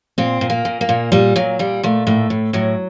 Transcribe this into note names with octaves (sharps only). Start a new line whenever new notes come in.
A#2 C4
A#2
A#3
A#2
A#3
A#2
A#2 G3
A#2 F#3
A#2 G3
A#2 A3
A2 A3
A2
A2 F#3